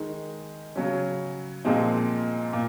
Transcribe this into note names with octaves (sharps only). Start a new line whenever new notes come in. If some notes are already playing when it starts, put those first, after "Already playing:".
Already playing: D#3 G#3 D#4
C#3 F#3 C#4
A#2 F3 G#3 C4 D#4
A#2